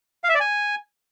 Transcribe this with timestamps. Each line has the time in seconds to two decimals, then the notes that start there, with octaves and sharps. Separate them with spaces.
0.24 F5
0.29 E5
0.35 D5
0.40 G#5